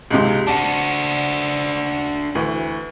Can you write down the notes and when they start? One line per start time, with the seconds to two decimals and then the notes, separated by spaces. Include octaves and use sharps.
0.11 C#2 G#2 C3
0.47 D4 F#4 A5
2.35 D2 E3